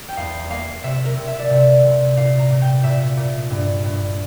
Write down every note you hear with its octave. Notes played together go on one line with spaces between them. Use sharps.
G5
E2 F5
A#3 F5
C3 E5
A#4
C3
E5
D5
C3 E5
C3
A#2 F5
A#5
A#2
G5
A#2 E5
A#2
G2
G2